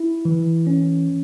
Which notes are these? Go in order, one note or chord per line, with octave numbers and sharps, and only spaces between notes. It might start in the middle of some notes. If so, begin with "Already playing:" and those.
Already playing: E4
E3
C#4